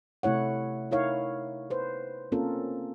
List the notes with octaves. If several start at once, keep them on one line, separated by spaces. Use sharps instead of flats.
C3 A3 E4 C#5 F#5
D#4 E4 A#4 C#5 F5
B4 C5
A#3 C4 C#4 F4 A4 A#4